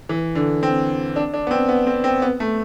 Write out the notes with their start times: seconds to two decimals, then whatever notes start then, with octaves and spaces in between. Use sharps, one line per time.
0.09 E3
0.35 D3
0.63 C4
1.16 D4
1.34 D4
1.47 B3
1.51 C4
1.69 B3
1.87 C4
2.04 C4
2.22 B3
2.40 A3